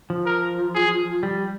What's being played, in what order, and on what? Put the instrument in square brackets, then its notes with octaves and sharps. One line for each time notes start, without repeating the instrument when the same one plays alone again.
[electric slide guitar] F3
[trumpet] A#4
G#4
[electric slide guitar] G3